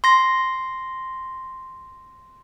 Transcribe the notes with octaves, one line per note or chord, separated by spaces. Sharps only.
C6 A#6